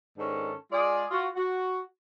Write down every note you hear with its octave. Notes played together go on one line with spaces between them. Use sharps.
G#2 D#3 C#4 D4 A4
G#3 F4 G#4 D5
F4 F#4
F#4